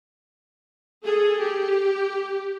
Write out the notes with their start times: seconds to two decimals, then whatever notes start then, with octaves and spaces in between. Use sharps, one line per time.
1.05 G#4 A4
1.42 G4